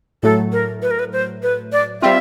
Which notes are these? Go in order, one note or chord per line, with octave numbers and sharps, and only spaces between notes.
A2 F#3 A3 A4
A#4
B4
A#4
B4
C5
B4
D5
G3 C4 F4 E5